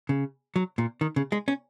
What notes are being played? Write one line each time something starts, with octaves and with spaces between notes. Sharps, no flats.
C#3
F#3
A#2
D#3
C#3
G#3
C#4